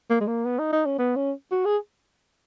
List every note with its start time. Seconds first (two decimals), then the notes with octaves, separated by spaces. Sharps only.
0.10 A#3
0.20 G#3
0.27 A#3
0.45 B3
0.59 D#4
0.72 D#4
0.86 C#4
0.98 B3
1.16 C#4
1.51 F#4
1.65 G#4